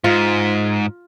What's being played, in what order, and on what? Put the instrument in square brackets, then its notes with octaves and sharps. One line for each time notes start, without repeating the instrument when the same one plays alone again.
[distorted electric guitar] G#2 [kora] F4